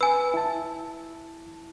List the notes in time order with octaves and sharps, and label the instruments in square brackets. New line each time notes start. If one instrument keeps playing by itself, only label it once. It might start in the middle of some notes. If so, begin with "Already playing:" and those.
[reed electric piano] B4 [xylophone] G#5 E6
[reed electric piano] E4 A5